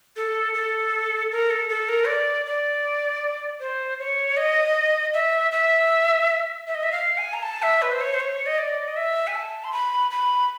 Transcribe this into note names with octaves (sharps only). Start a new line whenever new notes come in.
A4
A4
A#4
A4
A4
A#4
D5
D5
C5
C#5
D#5
E5
E5
E5
D#5
E5
F5
G#5
A#5
A5
E5
B4
C5
C#5
C5
C#5
D#5
D5
D#5
E5
G#5
A5
C6
B5
B5